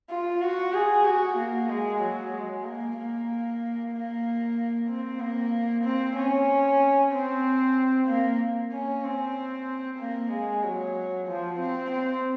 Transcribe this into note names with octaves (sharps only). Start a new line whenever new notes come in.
F4
F#4
G#4
F#4
A#3
G#3
F#3
G#3
A#3
A#3
A#3
C4
A#3
C4
C#4
C4
A#3
C#4
C4
A#3
G#3
F#3
F3
C4
C4